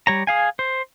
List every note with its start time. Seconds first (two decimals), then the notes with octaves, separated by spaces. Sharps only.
0.07 G3 C#5 A#5
0.27 G#4 F5 G#5
0.59 C5